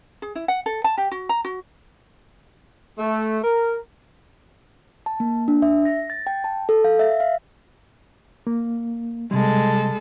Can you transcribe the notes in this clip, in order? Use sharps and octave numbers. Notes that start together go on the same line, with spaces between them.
G#4
E4
F#5
A4
A5
G4
F#4
A#5
F#4
A3
A#4
A5
A#3
D4
E5
A#6
A6
G5
A5
A4
F5
E5
F5
A#3
C3 G3 G#3 A4